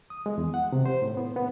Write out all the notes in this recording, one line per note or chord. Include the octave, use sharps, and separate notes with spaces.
D#6
G#3
E2
F#5
C3
C5
A2
B3
B3